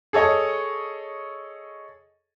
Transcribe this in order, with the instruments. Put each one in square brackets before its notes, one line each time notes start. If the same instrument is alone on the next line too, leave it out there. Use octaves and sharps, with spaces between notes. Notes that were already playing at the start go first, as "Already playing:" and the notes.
[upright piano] G#4 A4 C#5 D#5